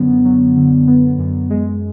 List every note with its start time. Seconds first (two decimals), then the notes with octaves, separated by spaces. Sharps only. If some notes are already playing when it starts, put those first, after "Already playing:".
Already playing: F#2 D3 F#3 B3
0.25 F#3
0.56 D3
0.88 B3
1.19 F#2
1.50 G#3